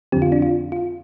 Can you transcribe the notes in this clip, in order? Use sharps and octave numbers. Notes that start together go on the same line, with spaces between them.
F2 D3 F3 C4 G4
F4
D4
F4
F4